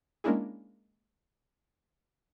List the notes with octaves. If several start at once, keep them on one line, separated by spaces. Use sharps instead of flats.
G#3 A#3 C#4 D4 E4 G#4